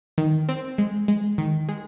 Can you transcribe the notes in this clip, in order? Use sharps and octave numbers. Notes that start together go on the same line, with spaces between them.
D#3
C4
G#3
G#3
D#3
G#3